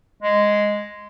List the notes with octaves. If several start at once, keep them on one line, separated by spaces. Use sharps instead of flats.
G#3